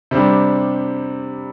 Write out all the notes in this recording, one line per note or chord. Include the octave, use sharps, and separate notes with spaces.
C3 G3 D4